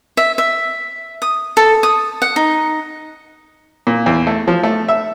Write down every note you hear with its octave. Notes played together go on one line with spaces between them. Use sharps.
E5
E5
D#6
A4
D#6
F#5
D#4
A#2
E2
A3
F3
A3
E5